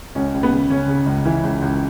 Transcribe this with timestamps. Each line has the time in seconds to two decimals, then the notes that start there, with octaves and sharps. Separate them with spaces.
0.15 C#2 C#4
0.34 C#2
0.43 B3
0.52 C#3
0.70 C#3 C#4
0.88 C#3
1.06 C#2
1.25 E3
1.43 C#2
1.62 C#2